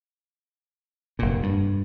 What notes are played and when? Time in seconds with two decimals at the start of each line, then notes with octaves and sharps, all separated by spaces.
1.19 F1 A#2
1.43 G2